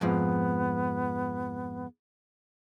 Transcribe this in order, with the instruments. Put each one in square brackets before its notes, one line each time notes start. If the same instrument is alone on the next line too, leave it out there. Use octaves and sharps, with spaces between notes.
[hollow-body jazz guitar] F2 G#2 F3 [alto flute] B3